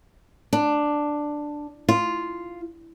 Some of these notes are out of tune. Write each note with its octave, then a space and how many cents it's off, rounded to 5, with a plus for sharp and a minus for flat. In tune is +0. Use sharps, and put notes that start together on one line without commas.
D4 +5
F4 -5